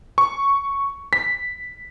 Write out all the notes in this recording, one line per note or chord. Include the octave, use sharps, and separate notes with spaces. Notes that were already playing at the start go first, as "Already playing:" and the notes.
C#6
B6